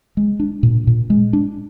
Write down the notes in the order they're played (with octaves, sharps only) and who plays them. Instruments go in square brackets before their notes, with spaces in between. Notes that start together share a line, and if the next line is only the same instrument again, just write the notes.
[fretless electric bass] G#3
D4
A#2
A#2
G#3
D4